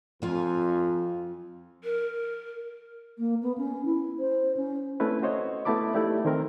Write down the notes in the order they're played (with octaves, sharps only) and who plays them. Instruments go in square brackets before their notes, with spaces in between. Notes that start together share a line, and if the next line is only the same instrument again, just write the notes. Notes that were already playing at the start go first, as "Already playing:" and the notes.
[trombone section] F2 [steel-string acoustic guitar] F3 F4 G#5
[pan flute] A#4
[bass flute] A#3
B3
C#4
E4
C5
C#4
[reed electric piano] A3 C4 C#4 E4 B4
F#4 C5 C#5 D#5
A3 B3 E4 A5 B5 D6
A3 D#4 E4 G4 D5
D#3 C4 A#4